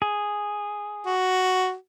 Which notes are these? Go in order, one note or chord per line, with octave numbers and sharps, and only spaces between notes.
G#4
F#4